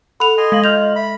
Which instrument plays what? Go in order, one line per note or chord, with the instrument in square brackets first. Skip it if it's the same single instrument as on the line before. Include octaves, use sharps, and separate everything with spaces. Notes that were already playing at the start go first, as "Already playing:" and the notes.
[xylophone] A4 F7 [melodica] F#5 [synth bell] B5
[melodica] D#5 G#5 C6
[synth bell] G#3 A#6 F#7 [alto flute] F5
[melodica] F4 [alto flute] D#5 [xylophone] F6 G6 F7
[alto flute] E5 [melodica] B5